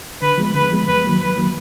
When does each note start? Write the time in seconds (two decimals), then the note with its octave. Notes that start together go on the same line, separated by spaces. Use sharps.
0.22 D3 B4
0.38 F3 G#3 B3
0.55 D3 B4
0.72 F3 G#3 B3
0.88 F#2 B4
1.04 D#3 F#3 A#3
1.21 F#2 B4
1.37 D#3 F#3 A#3